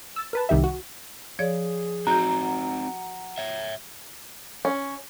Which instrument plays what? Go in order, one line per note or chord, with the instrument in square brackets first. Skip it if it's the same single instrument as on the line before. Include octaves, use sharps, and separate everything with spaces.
[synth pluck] E6 A6
A#4 B4 A5
C2 D#3 G4 E5
F#4
[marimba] F3 C#5 D5 [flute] G#4
[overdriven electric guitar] C4 D#4 [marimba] F#4 G6 [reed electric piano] A#5
[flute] F#5
[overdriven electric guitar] C#5 E5
[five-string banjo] C#4